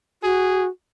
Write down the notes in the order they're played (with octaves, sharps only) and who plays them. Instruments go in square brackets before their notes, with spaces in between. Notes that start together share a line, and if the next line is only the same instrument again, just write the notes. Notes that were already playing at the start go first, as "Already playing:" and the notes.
[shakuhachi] F#4 [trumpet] G#4